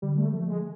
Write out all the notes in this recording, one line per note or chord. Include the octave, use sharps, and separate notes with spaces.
D3 G3
A3
F3 A3
G#3